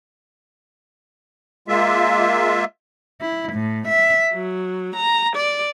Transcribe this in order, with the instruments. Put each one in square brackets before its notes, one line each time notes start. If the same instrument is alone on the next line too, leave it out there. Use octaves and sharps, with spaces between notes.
[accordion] G#3 A#3 F4 E5
[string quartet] E4
A2
E5
F#3
A#5
D5